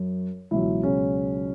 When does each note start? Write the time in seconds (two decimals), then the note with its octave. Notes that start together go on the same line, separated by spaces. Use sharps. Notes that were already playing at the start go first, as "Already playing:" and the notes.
Already playing: F#2 F#3
0.51 C#2 B2 E3 F#3 E4
0.83 C#3 C#4